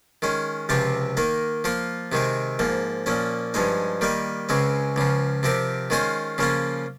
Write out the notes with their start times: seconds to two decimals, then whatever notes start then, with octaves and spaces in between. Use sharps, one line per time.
0.22 D#3 G#3 C#4
0.69 C#2 C3 F3 C4 F4
1.17 D#3 A#3 D#4
1.64 F3 A#3 F4 A#4
2.12 C3 D#3 G#3 C4
2.59 G#2 F3 A#3
3.06 A#2 F3 A#3 C#4
3.54 G2 F3 G#3 D#4
4.01 D#3 G3 A#3 D#4
4.49 C#2 C#3 G#3 C4
4.96 C#2 C#3 F3
5.43 C3 F3 C4 G4 A#4
5.90 D#3 G#3 C#4 F4 C5
6.38 C#3 F3 A#3 C#4 F4